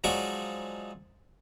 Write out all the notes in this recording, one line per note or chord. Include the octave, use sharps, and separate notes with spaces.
F3 F#3 G#3 D#4 D5 C#6